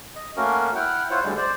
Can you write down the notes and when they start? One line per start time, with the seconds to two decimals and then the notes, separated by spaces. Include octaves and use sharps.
0.16 D#5
0.37 A3 A#3 C#4 F#4 A#4
0.75 E4 F#5 G5 F6
1.11 E4 F4 C5 C#5 F#5
1.24 D2 D3 G3 G#3
1.37 C5 D5